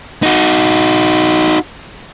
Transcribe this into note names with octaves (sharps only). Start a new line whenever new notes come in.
D#4 F#4